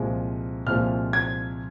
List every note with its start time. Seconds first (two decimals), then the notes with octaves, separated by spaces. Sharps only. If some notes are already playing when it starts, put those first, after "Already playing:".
Already playing: C2 A#2 F3 G#3
0.67 C2 A#2 F3 G#3 F6
1.13 G#6